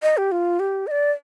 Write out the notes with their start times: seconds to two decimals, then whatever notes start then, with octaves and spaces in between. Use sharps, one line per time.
0.02 D#5
0.17 G4
0.32 F4
0.60 G4
0.87 D#5
0.91 D5